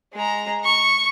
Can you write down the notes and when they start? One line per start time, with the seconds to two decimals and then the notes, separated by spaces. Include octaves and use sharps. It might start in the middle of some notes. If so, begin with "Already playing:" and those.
0.13 G#3 A#5
0.65 C#6